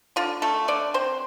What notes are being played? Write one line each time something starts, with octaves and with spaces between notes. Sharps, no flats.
D3 F4
A3 A4
D3 D5
C4 C5